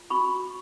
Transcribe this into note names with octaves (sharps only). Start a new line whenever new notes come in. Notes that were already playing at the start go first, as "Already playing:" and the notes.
Already playing: F4
F#4 B5 C#6